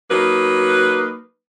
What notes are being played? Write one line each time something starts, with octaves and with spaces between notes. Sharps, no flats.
F#3 A#3 D#4 B4